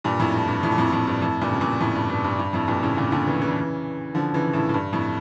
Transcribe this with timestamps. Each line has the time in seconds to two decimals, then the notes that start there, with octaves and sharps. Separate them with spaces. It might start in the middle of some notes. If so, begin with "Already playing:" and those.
0.04 G2 A#2
0.19 F2 A2
0.34 G2
0.48 G2
0.63 F2 A2
0.72 A#2
0.78 F2 A2
0.92 F2 A2
1.07 G2
1.22 F2 A2
1.41 G2 A#2
1.53 C#3
1.60 G2 A#2
1.80 F2 A2
1.95 G2
2.10 G2
2.24 G2
2.39 G2
2.53 F2 A2
2.68 G2 A#2
2.83 A2 C#3
2.97 A#2 D3
3.12 A#2 D3
3.27 C#3 E3
3.41 C#3 E3
4.15 D3 F3
4.34 C#3 E3
4.53 A2 C#3
4.69 A2
4.74 G2
4.93 F2 A2